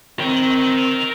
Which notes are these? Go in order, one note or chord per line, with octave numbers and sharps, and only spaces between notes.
C4 A#4 G5